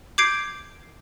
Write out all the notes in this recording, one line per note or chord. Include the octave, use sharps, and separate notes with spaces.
D6 G6 G#6 C7 D7